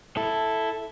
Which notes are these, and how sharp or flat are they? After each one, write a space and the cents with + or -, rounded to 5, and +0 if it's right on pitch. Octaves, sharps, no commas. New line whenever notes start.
E4 +0 A4 +0